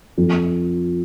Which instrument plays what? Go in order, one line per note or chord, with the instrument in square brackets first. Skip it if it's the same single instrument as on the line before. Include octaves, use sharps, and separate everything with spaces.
[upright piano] F2